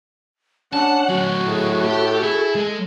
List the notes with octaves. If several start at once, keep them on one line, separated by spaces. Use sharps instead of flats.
C#4 D4 F#5 A5
F#3 A3 F#4
A2 G#4
G4 A4 G5
E4 G#4
G#3